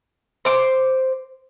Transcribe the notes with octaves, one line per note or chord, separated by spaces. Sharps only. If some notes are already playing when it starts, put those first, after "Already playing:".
C5 D6